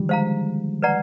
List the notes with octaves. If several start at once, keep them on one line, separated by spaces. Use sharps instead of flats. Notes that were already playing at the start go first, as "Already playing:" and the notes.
Already playing: D3 D#3 F3 G3
G#3 C5 F5 A#5
B4 D5 F#5 A#5